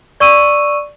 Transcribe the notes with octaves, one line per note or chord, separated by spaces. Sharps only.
D5 C#6 E6 D#7